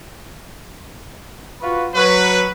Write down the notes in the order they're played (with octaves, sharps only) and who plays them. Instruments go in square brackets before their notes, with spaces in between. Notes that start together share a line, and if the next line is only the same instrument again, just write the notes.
[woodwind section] F4 F#4 B4
[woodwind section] F#3 [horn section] B4